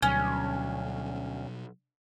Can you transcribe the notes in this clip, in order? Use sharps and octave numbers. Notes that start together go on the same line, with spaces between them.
D2 B2 F#3 G3 C#4